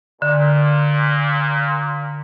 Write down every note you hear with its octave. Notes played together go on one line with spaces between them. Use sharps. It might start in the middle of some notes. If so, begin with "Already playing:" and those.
A#2 D3